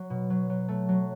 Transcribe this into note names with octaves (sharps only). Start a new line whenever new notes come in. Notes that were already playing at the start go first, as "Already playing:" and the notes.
Already playing: F#3
B2
F#3
F#3
A3
F#3